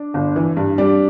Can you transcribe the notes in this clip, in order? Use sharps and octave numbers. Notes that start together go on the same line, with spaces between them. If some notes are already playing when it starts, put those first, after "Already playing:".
Already playing: D4
G1
E3
G2
G3 D4